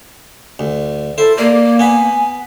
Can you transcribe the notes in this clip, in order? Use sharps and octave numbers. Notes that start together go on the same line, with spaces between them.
D2
E4 A4 C5
A#3 A#4 D5
B3 F#5 G#5 B5